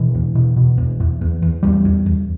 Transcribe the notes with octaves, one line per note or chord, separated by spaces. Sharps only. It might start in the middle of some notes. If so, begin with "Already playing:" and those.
Already playing: B2 E3
E2
B2
B2
E2
E2
E2
E2
E2 G3
E2
E2